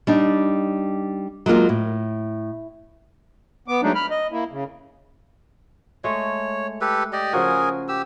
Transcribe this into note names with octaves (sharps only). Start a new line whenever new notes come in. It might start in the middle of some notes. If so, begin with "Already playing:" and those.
G3 D4 D#4
F#3 G#3 A#3 F4 A#4
A2
B3 D6
F#3 G#3 A3 D4 D#4
B5 F6
D#5
A#3 E4
C#3
G#3 A3 C#5
G4 A4 B4
G4 D5 D#5
C#3 F3 F#4 G#4 A#4 G#5
G4 E6